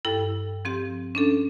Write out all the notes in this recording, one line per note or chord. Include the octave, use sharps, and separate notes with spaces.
G2 E4 A4 G5
F3 C4 G4
C#4 D4 A4